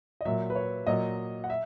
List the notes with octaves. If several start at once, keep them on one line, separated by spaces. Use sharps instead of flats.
D#5
A#2 F#3 E5
B4
C#5
A#2 F#3 D#5
F#5
E5